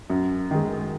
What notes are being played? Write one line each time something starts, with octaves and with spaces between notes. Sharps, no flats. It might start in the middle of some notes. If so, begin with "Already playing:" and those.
F#2
D#3 G#3